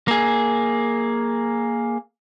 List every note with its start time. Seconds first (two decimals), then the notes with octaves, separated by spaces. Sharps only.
0.08 A#3 G#4